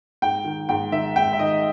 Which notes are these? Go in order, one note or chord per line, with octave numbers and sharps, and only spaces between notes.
G#2 G5
D#3
G#2 G5
D#3 E5
G#2 G5
E5
D#3 D#5